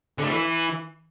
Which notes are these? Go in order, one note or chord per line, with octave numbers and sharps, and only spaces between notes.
D3
A3
E3